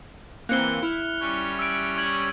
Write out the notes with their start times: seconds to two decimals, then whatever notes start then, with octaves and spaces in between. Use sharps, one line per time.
0.49 E3 A#3 C4 F#6 C#7 G7
0.83 E4 F6
1.20 G3 C#4 C#5
1.59 E6 D7
1.97 C#6 G#6 F#7